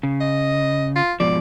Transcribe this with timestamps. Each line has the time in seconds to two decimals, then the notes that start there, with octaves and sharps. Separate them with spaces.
0.03 C#3
0.20 D#5
0.96 F4
1.20 G#2 B2 F3 D5